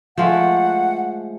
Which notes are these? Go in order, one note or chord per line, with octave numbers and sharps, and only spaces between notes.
F3 G#3 A3 F#5